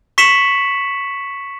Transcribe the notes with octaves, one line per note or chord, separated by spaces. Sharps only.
C#6 B6 C#7 E7 F#7